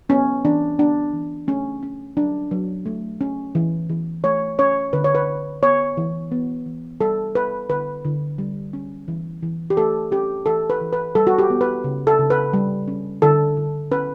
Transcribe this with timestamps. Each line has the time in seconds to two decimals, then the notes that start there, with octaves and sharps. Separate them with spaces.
0.09 B3 C#4
0.45 E3 D4
0.78 B3 D4
1.13 E3
1.47 A3 C#4
1.83 C#4
2.17 F#3 D4
2.51 F#3
2.86 A3
3.21 C#4
3.55 E3
3.90 E3
4.24 A3 C#5
4.59 C#4 C#5
4.93 D3 B4
5.04 C#5
5.15 B4
5.27 D3
5.62 B3 C#5
5.97 E3
6.32 B3
6.66 E3
7.00 G3 A4
7.35 B3 B4
7.69 D3 B4
8.05 D3
8.38 G3
8.73 C#4
9.08 E3
9.43 E3
9.70 G4
9.77 A3 A4
10.11 C#4 G4
10.46 E3 A4
10.70 B4
10.81 E3
10.93 B4
11.15 G3 A4
11.27 F#4
11.38 G4
11.50 B3
11.61 B4
11.84 C#3
12.07 A4
12.19 C#3
12.30 B4
12.53 G3
12.88 C#4
13.22 D3 A4
13.57 D3
13.91 C#4 B4